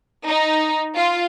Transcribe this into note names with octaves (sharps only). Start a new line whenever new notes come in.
D#4
F4